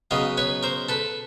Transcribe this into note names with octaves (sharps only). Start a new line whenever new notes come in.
C#3 F#3 B3 D#5 F5
B4 C#5
A#4 C5
A4 B4